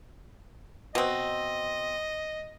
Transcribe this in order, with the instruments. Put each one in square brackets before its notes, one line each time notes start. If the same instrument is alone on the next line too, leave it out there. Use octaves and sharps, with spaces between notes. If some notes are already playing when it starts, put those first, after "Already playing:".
[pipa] B2 C4 [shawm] D#5